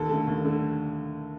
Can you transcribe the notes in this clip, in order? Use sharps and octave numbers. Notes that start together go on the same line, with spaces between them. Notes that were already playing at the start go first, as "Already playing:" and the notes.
Already playing: D#2 A4
D3 A3
D#2
D3 A3